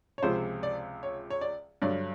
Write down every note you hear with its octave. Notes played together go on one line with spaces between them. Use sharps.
C#5
C#2 C3 F3 G#3 C5
D5
C#5
C#5
D5
G2 D3 F#3 D5